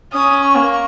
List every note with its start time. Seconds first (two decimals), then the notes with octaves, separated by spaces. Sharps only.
0.13 C#4 D#6
0.41 C#6
0.56 A#3
0.71 C#6